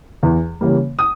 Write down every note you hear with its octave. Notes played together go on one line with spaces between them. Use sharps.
E2
C#3 E3 G3 A#3
D#6